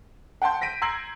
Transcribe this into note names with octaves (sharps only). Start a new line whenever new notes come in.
F#5 G5 A5 C6 G6
A#6 B6 D7 D#7
A#5 C6 E6 G#6 C7 F#7